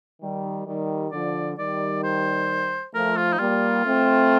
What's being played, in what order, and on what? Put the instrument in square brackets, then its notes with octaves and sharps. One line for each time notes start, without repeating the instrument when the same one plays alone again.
[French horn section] D#3 G3
D#3 G3
[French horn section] D3 F3 [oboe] D5
[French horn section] D#3 G3 [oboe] D5
[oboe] C5
[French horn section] F3 A3 [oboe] A#4
[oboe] F4
D#4
[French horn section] G3 A#3 [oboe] F4
[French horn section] A3 C4